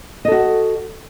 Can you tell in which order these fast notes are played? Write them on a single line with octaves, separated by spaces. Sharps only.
D#5 A4 F#4